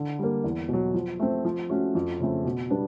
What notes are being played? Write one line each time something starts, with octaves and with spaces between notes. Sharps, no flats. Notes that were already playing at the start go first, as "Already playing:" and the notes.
Already playing: D3
G3 A#3
E2
B2 F#3
F3
A3 C4
F3
A3 C#4 F#4
F2
C#3 F3 A3 C4
B2
G3 B3 D4